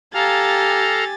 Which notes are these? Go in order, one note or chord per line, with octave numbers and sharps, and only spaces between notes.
G4 A4 F5 G#5 A#5 A6